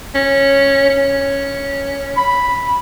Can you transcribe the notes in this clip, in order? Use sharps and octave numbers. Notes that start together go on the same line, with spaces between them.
C#4
C#4
B5